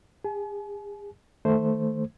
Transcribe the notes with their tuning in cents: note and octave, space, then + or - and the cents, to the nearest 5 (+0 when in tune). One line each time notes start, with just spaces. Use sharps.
G#4 -40 G#5 +45
D#3 +0 A3 +0 C5 +0